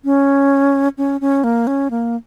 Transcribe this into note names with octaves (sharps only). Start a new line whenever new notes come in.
C#4
C#4
C#4
A#3
C#4
A#3